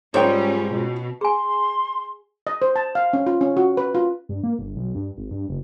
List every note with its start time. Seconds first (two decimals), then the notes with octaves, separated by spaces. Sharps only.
0.14 G#2 G3 C#4 D#4 F4 C#5 G5
0.73 B2
1.21 G#4 G#5 C6
2.47 D#5
2.62 C5
2.76 A5
2.95 F5
3.13 C#4
3.26 F4
3.41 C#4
3.57 F#4
3.77 B4
3.95 F4
4.29 G2
4.43 A#3
4.59 G1
4.76 B1
4.95 G2
5.17 G#1
5.31 G2
5.49 F#1